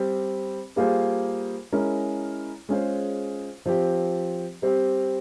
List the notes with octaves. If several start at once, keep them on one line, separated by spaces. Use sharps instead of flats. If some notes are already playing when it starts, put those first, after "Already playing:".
Already playing: G3 C4 G4
G3 A#3 F4 G#4 C5
G#3 C#4 E4 A#4
G#3 C#4 F4 G#4 C5
F3 C4 G4
G3 C4 G4